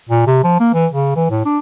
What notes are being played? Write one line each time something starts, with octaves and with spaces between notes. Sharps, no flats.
A#2
C3
F3
A#3
E3
C#3
E3
A2
D4